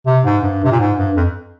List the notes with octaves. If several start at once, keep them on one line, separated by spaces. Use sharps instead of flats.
C3
G#2
G2
C3
A#2
G#2
G2
F2